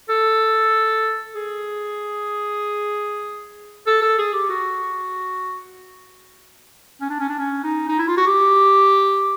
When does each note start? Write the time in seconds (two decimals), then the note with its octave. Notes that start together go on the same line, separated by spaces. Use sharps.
0.09 A4
1.35 G#4
3.87 A4
4.02 A4
4.19 G#4
4.34 G4
4.50 F#4
7.01 C#4
7.10 D4
7.20 C#4
7.29 D4
7.39 C#4
7.64 D#4
7.89 D#4
7.99 E4
8.08 F4
8.18 F#4
8.27 G4